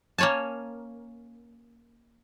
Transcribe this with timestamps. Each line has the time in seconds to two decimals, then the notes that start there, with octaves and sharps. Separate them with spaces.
0.18 A#3 C#4 C#5 G#5 A5